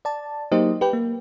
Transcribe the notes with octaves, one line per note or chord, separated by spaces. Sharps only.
D5 A5
F#3 A#3 D#4 G4 C5 D#5
G4 B4 G5
A#3